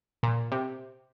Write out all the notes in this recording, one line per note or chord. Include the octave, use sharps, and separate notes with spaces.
A#2
C3